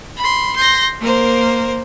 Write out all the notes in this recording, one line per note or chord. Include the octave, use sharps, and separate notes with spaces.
B5 C6
C6 G6 A#6
A#3 A#4 C5